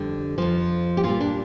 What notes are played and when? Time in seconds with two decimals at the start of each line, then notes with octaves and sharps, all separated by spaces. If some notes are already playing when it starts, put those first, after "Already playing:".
Already playing: F2 D3 G3
0.38 F2 F3
0.97 G4
1.03 A#2 G3 F4
1.20 D4